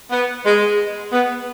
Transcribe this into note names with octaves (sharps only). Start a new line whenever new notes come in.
B3
G#3
B3